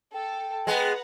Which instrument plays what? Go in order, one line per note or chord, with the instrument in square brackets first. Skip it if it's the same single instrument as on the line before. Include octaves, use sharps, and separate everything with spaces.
[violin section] A4 [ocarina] G5
[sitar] G#3 B3 [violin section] B4 F#5 A#5